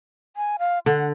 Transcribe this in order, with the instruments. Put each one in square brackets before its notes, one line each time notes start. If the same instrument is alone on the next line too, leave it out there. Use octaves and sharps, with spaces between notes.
[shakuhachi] G#5
F5
[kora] D3 [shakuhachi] F#5